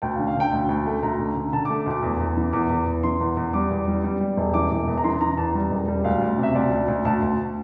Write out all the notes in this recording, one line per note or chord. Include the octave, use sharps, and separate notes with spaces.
D2 G5
F5
D3
F5
D3 G5
D2
D2
A3
D2 A#5
D3
D3
D3 A5
D6
A3
D2 D6
E2
E2
E3
E2 D6
E2
E2
E3 C6
E2
E2
G3 D6
E2
G3
G3
G3
E1
E3 D6
E1
E2
A#5
E3 C6
E3 A#5
E2 A5
G3
E1
G3
D2 F5
D2
C3
E5
D2 D5
D2
D2
D2 A5
D2